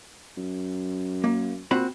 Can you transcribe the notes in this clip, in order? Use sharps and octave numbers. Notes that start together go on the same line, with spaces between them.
F#2
A#3
A#2 C4 F#4 B5